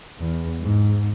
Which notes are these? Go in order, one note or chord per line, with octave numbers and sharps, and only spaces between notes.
E2
G#2